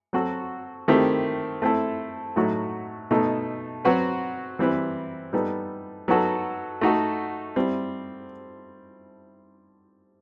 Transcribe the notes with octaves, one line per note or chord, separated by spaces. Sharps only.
F#3 C4 F#4 A4
D#3 A3 C4 E4 G4
A3 C4 E4 A4
A2 F#3 A3 D#4 F#4
B2 A3 D#4 A4
F#3 C4 F#4 B4
E3 G3 C4 E4 B4
G3 B3 D#4 A4
F#3 B3 D#4 F#4 A4
A3 D#4 F#4 A4
G3 C4 E4